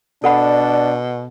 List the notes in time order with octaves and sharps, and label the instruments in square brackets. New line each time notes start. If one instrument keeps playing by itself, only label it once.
[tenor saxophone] B2 [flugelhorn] D4 [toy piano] A4 F#5 B5 [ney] D5